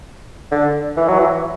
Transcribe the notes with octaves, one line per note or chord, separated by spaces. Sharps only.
D3
E3
F#3
E3